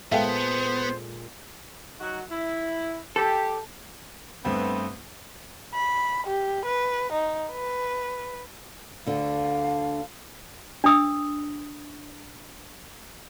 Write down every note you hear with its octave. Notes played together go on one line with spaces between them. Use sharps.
A#2 G#3 B3 A4 C5 E5 F5 G5
F#3 D#4 F#4
E4
G4 A4
G2 A3 B3 C4
B5
G4
B4
D#4
B4
D2 D3 F5
D4 D#6 E6